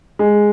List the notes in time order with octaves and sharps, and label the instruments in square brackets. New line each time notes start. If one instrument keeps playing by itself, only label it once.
[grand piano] G#3